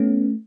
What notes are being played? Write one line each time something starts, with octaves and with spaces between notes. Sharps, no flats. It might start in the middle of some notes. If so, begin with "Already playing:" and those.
Already playing: A3 B3 C#4